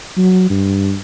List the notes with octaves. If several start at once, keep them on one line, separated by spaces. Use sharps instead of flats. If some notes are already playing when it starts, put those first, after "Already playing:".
F#3
G2